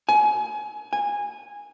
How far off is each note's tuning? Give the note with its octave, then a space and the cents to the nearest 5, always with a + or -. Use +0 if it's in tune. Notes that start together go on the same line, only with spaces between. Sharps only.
G#5 +25
G#5 -15